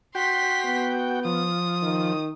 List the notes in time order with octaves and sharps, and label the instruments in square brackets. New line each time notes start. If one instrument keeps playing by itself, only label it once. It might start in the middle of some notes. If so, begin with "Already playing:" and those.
[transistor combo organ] F#4 G5 [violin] C6 B6
[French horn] B3
[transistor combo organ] F3 [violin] D#6
[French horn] D#3